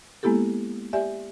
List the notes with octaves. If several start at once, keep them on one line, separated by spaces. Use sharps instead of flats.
G#3 A#3 B3 E4 G4 A4
G4 D5 E5 G#5